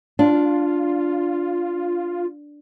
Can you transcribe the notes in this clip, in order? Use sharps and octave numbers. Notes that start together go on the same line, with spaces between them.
D4 F4